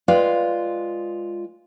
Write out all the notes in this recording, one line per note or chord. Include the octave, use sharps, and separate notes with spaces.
G#3 F4 B4 D5 F5 G5